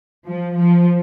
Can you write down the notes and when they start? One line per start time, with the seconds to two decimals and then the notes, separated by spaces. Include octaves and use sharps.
0.26 F3
0.56 F3